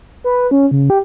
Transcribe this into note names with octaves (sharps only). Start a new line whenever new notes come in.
B4
C#4
C#3
G4